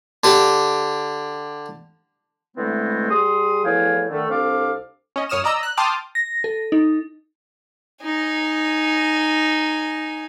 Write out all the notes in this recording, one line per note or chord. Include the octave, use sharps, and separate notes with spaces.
D3 G4
D3 E3 G#3 A3 B3 C4
G3 G#4 C6 D#6
E2 A2 F3 F5 G5 G#5
D3 D#3 A3
C2 C4 D4 A4 F5 D6
C#4 D#5
F#2 C#5 D#6 F6 E7
D5 D#5 A#5 E6
F#6
G5 A5 C6 D6 D#6 F6
A#6
A4
D#4
D#4 G#5